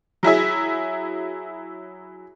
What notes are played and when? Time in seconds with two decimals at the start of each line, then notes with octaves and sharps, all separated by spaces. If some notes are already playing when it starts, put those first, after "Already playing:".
0.23 F#3 E4 G#4 E5